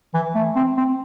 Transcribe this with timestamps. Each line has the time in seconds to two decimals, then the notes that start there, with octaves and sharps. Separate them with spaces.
0.14 E3
0.35 A3
0.56 C4
0.77 C4